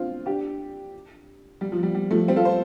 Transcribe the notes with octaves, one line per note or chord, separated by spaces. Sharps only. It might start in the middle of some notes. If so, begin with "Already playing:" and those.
Already playing: C4 D4 F4
D4 G4
G3
F3
G3
G3
F3 A3
G3 C4
F4 A4
C5